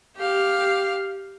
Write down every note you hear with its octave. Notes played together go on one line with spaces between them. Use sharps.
G4 F5